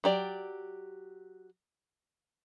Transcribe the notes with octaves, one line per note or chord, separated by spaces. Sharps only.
F#3 G4 D5